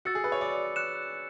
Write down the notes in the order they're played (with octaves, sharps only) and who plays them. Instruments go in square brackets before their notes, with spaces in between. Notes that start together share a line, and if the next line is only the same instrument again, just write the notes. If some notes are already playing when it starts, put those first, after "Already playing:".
[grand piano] F#4 [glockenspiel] E6 A6 C#7
[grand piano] G#4
B4
C#5
D5
[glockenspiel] F#6 C#7 E7